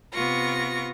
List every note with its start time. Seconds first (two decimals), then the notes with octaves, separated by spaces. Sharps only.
0.13 C3 B3 F4 C#6 A#6